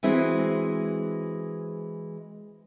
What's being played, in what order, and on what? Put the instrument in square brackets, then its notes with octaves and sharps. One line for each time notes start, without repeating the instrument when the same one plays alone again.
[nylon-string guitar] E3 G#3 C4 E4 F#4